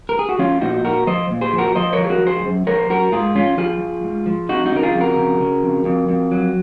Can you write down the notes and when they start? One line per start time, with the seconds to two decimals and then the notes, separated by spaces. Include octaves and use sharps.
0.09 A#4
0.19 G#4
0.29 F#4
0.39 F3 C#4 F4
0.61 A#2 D#4 F#4
0.84 A#2 F#4 A#4
1.07 F3 C5 D#5
1.30 A#2
1.41 G#4 C5
1.53 F3
1.58 F#4 A#4
1.75 F3 C5 D#5
1.93 A#4 C#5
1.98 F3
2.05 G#4
2.10 F#4 A#4
2.21 F3
2.27 G#4 C5
2.45 F#2
2.67 F3 A#4 C#5
2.79 C5
2.89 F#2 F#4 A#4
3.12 G#2 F4 G#4
3.35 F3 C#4 F4
3.58 F3 F4 G#4
3.81 F3
4.04 G#2
4.26 F3
4.49 F2 D#4 F#4
4.66 D#4 F#4
4.72 C#3 A#4
4.83 F4 G#4
4.94 F2
5.00 F#4 A#4
5.17 C#3
5.41 C#3
5.63 F2
5.85 F2
6.09 F2
6.31 F#3